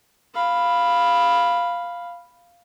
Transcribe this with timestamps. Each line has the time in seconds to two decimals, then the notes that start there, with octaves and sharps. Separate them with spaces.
0.35 F5 B5